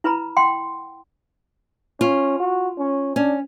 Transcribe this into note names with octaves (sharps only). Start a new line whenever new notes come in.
E4 B4 A#5 B5
F#5 G5 C6
C#4 F4
F#4
C#4
C#4 D4